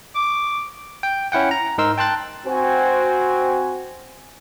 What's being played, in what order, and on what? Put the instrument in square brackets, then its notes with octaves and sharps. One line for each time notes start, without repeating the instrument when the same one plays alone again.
[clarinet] D6
[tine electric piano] G5
C#4 E4 F#5 G5
A#5
G#2 D#4 A#4 C6 E6
G5 A5 C6 F#6 A6
[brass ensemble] C4 F#4 C5 G#5